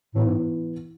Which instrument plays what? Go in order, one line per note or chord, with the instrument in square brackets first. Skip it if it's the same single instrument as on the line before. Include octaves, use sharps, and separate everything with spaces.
[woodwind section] A2 [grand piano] E3 B3 E4
[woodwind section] G#2